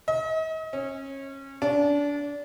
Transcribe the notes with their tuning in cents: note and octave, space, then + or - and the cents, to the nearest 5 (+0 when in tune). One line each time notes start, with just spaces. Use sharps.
D#5 +40
C#4 -25
D4 -25